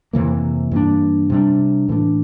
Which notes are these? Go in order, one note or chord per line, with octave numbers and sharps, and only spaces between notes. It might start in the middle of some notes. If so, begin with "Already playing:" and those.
F2 C3 E3 A#3
G2 E3 A#3 D4
C3 G3 D4
A2 E3 A3 D4